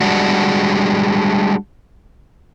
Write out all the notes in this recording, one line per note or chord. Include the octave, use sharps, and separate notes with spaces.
G3 G#3 D4 F#4